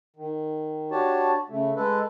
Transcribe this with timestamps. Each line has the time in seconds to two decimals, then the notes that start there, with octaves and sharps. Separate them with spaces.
0.16 D#3
0.91 D4 F#4 G4 C#5 A5
1.49 C#3 A3
1.76 G#3 A4 B4